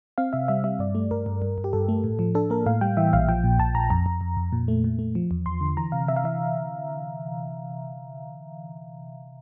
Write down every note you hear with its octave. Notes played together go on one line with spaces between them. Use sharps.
C4 F5
C3 E5
G3 E5
G3 E5
G2 D5
A3
G2 A#4
G2
G2
G2
G4
G2 A4
A3
A2
F3
D4 A4
A#3 A#4
A2 F5
G3 G5
E3 E5
A#1 F5
F3 G5
A#2
A#1 A5
A#1 A#5
F2 A#5
F2
F2
F2
A#2
A3
A#2
A3
F3
E2
E2 C6
D3
E3 A#5
C3 F5
C3 E5
F5
E3 E5